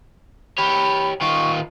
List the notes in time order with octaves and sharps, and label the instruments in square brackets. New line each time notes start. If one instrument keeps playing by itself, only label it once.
[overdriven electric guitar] G4 C#5 [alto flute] B5
[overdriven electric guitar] D#3 F4 [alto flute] C#6